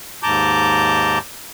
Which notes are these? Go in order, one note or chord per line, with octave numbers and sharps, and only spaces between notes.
D#2 G#2 A5 A#5 D6 G6